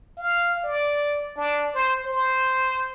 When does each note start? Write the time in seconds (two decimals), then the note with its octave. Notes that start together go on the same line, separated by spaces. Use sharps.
0.18 F5
0.63 D5
1.37 D4
1.75 C5
2.06 C5